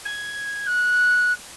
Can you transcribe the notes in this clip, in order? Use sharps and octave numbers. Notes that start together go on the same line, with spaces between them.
G#6
F#6